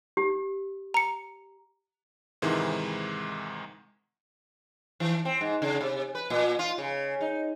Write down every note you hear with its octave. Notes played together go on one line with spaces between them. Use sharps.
G4
A#5 C#7
G#2 C3 D#3 E3 G#3 E4
E3
C4
G#2
C#3
C3
B4
A#2
F4
C#3
D#4